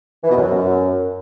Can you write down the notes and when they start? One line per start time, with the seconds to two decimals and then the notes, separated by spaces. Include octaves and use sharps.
0.24 E3
0.30 B2
0.36 F#2